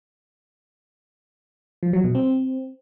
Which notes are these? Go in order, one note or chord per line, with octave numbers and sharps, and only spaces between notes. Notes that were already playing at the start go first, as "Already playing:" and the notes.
F3
F#3
B2
C4